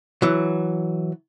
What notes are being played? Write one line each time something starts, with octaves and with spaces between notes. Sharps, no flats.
E3 F#3